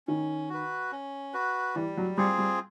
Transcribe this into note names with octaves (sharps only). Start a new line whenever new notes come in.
D#3 C#4
F#4 B4
C#4
F#4 B4
E3 G3
F#3
G3 C4 F4 G#4
G3